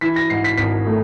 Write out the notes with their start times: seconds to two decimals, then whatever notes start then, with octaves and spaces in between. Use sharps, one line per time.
0.01 E3 B6
0.16 A#6
0.30 G#2 C7
0.44 B6
0.57 G#1 B6
0.86 A3